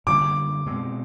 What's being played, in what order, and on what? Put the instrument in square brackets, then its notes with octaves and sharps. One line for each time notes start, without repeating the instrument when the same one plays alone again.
[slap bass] F#2 D3 G3 A#3 [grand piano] D6
[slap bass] B2 G#3 C4